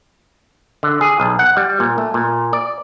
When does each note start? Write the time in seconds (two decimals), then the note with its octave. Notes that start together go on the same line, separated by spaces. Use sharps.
0.83 D3
1.01 G#4
1.20 B1
1.39 F#5
1.57 G3
1.80 A#2
1.98 A3
2.14 A#2
2.53 D5